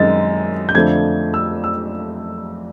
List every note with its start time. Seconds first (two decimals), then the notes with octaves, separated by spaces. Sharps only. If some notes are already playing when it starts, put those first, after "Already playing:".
Already playing: F#2 D#3 G#3 C4 D#4 A6
0.69 G6
0.75 F2 D3 F3 A3 D4 G#6
1.34 E6
1.64 E6